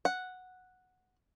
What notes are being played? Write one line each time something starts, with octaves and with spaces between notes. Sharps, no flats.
F#5